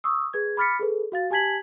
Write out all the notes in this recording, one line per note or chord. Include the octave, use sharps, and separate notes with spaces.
C#6 D#6 E6
G#4 B4 G#6
B5 D6 F6 A6 B6 C#7
G#4 A4 B4
F#4 F5 A6
G4 G#5 A5 G#6 B6 F#7